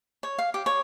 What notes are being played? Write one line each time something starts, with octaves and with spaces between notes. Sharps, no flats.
C#5
F5
G4
C#5